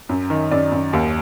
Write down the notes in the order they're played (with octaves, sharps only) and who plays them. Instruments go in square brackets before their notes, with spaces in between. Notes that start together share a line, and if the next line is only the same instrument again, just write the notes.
[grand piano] F#2
D#3
F#2 D5
F#2
D#2